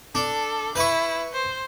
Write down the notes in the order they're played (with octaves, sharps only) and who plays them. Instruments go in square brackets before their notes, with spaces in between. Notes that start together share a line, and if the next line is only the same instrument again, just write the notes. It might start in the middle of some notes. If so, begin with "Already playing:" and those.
[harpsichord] D4 [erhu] A4
[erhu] E4 [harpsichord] B4 C#6
[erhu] C5